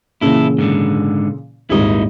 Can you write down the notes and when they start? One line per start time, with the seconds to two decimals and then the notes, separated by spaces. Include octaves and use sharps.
0.21 A#2 C#3 E3 E4 A4
0.58 G#2 D3
1.70 D#1 G#1 A#2 E4 D#5